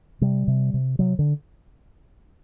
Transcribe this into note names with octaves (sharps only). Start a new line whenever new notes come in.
C3 G3
C3
C3
C3 F#3
D3